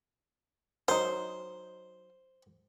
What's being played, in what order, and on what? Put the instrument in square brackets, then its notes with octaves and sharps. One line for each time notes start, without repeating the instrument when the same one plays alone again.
[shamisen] F#3 D#4 [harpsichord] C5